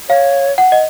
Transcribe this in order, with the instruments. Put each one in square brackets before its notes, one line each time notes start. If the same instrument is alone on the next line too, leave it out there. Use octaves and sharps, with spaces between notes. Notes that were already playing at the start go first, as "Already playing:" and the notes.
[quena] C#5 [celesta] F5
[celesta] F#5
D#5